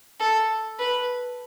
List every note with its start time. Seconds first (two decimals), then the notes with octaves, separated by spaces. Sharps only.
0.20 A4
0.79 B4